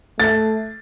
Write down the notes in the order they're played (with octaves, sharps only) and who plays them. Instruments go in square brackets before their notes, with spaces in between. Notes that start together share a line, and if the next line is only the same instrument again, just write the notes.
[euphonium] A3 [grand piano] A6